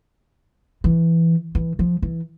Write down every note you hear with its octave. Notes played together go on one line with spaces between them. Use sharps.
E3
E3
F3
E3